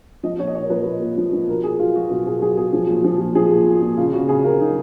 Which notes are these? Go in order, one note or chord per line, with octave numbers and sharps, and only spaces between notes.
F3 D#5
A#2 C#5
D#5
A#2 C#5
A#4
F3 B4
A#2
A#2
F3
F3
B2 A#4
B2 G#4
F#3 F4
F#3 F#4
B2 F#4
B2 G#4
F#3 G#4
B2 G#4
F3
A#2
F3
A#2
F3 G#4
A#2
A#2
A#2
C#3 F4
C#3 F#4
C#3 G#4
C#3 A#4
F#3 D#4